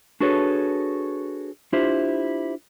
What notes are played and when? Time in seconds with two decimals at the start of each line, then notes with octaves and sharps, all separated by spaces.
0.20 D4 F#4 G#4 A4 B4 C#5
1.73 D4 E4 F4 G4 C5